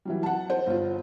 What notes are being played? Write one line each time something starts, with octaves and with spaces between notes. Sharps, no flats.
E3 F#3 G3
F#5 A5
C5
G1 F4